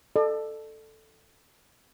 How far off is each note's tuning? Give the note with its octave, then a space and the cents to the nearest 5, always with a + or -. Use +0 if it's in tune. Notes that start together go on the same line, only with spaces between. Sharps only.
A4 +0 D5 +45